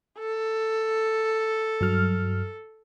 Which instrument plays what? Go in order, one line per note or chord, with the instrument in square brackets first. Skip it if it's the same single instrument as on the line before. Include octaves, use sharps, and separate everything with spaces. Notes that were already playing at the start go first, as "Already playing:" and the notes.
[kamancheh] A4
[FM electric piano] G2 F#3 F6